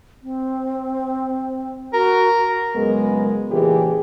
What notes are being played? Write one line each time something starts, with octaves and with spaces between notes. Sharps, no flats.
C4
F#4 A#4
F#2 C#3 G#3 B3 A#4
A#2 C#3 E3 G4 G#4